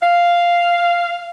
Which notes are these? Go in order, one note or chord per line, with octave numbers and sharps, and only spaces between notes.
F5